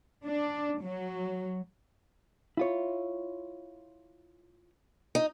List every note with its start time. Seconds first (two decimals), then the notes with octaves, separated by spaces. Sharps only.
0.25 D4
0.81 F#3
2.57 E4 F4 C#5
5.15 D#4